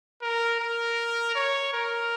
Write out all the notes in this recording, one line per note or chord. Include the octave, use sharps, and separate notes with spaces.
A#4
A#4
C#5
A#4